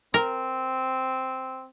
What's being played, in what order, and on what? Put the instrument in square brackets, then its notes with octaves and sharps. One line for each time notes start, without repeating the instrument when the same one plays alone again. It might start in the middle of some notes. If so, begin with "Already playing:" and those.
[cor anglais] C4 [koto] A#4